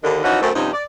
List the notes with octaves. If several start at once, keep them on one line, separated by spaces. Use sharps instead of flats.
D#2 D3 D#3
E3 F3 C#4 D#4 F#4
F#2 A3 C4
G2 C3 F3 C4 C#4 D#4
D5